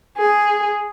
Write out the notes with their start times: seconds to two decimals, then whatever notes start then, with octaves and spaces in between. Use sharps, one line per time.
0.18 G#4